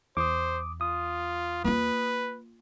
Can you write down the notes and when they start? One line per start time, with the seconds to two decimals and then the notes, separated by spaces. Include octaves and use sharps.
0.17 E2 C5 D6 D#6
0.81 F4 D#6
1.64 A#3 F4 B4